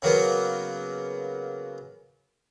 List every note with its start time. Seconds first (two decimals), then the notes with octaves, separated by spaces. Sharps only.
0.02 C#3 F#3 A#3 B3